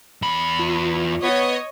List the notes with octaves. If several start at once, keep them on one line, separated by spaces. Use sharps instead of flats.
E2 B5
F4
B3 C#5 D#5